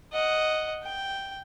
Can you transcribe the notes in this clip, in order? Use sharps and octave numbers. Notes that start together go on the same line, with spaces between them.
D#5 F#5
G5